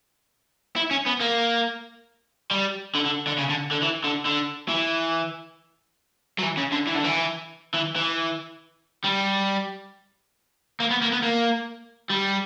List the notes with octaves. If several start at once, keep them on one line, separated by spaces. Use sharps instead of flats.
E4
C#4
B3
A#3
G3
D3
D3
D3
C#3
D3
D3
E3
D3
D3
E3
F#3
E3
C#3
D3
E3
D3
E3
E3
E3
G3
A#3
B3
A#3
B3
A#3
G3